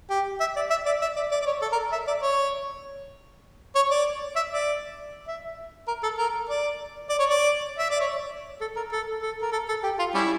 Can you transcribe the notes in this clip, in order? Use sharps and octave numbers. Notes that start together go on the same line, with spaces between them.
G4
E5
D5
E5
D5
E5
D5
D5
D5
C#5
A4
A#4
E5
D5
C#5
C#5
D5
E5
D5
E5
A#4
A4
A#4
D5
D5
C#5
D5
E5
D5
C#5
A4
A#4
A4
A4
A#4
A4
A4
G4
F4
G3 C#4 E4